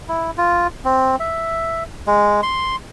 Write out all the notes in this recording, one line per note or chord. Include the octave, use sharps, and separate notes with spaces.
E4
F4
C4
E5
G#3
C6